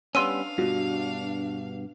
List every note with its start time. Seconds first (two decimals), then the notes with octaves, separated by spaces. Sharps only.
0.15 G3 B3 C#4 D4 F5 C6 E6 D#7
0.58 G2 B2 F#4